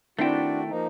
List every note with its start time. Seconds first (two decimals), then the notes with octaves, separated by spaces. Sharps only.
0.19 D#3 A3 C4 D4 E4 F#4 G5
0.69 F3 A#3 D#4